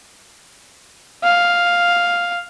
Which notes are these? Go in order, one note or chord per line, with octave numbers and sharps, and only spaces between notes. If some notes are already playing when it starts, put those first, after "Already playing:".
F5